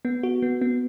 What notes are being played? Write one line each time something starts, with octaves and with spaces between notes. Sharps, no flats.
B3
F#4
B3
B3